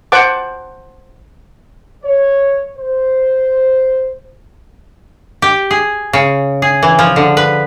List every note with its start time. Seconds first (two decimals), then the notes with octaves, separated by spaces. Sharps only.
0.12 C5 F#5 A5 D6
2.05 C#5
2.77 C5
5.42 G4
5.71 G#4
6.13 C#3
6.62 G#4
6.83 E3
6.99 F3
7.16 D3
7.37 B4